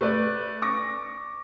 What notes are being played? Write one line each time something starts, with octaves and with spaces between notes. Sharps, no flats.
A3 B4 D5
C#6 D6 A#6